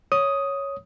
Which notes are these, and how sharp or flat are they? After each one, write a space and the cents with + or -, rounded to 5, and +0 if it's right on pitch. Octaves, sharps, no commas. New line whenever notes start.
C#5 +0 D#6 +5